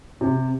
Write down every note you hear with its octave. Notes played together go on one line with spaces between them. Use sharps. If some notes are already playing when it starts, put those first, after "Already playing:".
C3